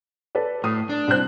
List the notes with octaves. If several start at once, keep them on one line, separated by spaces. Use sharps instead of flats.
A4 B4 D5
A2 D#6
D4
C2 C5 F#6